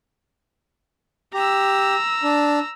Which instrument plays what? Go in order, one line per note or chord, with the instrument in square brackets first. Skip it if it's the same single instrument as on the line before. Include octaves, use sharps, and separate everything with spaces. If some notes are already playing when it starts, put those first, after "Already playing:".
[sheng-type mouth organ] G4 [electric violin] A#5 E6
[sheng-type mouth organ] D4